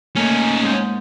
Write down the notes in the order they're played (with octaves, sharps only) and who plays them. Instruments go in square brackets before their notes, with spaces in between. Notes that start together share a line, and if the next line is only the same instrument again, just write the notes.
[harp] A3 A#3 [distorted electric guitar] C#4 D#4
[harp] G#2 G6